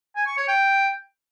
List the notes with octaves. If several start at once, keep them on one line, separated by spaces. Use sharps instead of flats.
G#5
C#6
C#5
G5